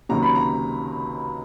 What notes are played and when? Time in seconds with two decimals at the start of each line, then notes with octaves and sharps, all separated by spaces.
0.09 C#2 C3 D#3 F#3 A#3 A#5
0.23 B5
0.36 A#5